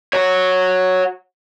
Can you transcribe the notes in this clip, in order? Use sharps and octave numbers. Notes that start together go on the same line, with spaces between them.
F#4 C#5